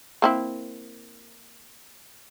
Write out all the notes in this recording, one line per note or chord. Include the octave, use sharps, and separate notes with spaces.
A#3 C4 E4